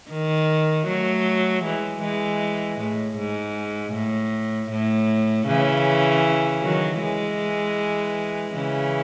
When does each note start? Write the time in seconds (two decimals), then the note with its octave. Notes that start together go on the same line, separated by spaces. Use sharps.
0.11 D#3
0.87 F#3 A3
1.64 E3 G#3
2.02 E3 G#3
2.79 A2
3.17 G#2
3.94 A2
4.71 A2
5.47 C#3 E3
6.62 D#3 F#3
7.00 E3 G#3
8.54 C#3 E3